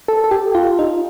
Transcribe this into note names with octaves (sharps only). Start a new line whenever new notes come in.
A4
A4
G4
F4
D#4